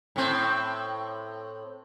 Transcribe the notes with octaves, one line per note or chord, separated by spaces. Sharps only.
A2 C4